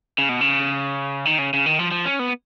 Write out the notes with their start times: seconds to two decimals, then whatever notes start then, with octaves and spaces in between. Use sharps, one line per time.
0.18 C#3
0.29 B2
0.41 C#3
1.25 D#3
1.39 C#3
1.53 C#3
1.66 D#3
1.79 F3
1.92 F3
2.05 C#4
2.19 B3